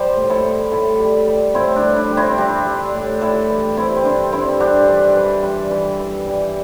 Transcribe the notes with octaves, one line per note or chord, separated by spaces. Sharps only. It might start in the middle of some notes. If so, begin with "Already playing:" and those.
Already playing: G3 G4 C5
A2
E4 A4
A2
A2 E4 A4
G3
G3
A2 C4 E4
D4
G3
D4
G3
C4 E4
G3 D4 G4
G3
A2
G3 E4 A4
E3
G3 C4 E4
C4
G2 D4
G2 C4 E4
G2 D4 G4
E3
E3
G3
E3
E3
G3